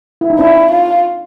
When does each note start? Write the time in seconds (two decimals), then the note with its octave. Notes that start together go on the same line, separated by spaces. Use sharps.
0.21 E4
0.30 D#4
0.39 C4 D4 E4
0.71 F4